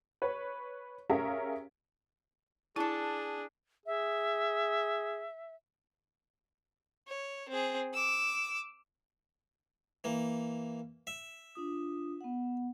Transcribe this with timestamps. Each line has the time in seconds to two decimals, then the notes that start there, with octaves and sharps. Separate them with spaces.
0.22 B4 C#5
1.10 C#4 G4 G#4 A#4 E5 F5
2.76 D4 E4 G#4 A4 A5
3.86 G#4 E5
7.08 C#5
7.49 C4 G#4
7.94 D6 E6
10.04 E3 A#3
11.07 E5
11.55 D4 F4 D#6
12.21 B3 F#5